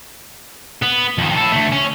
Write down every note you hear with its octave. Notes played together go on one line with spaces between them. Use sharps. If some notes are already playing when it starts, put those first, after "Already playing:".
B3
F2 D#3
E4 A4
D2 A3
C#4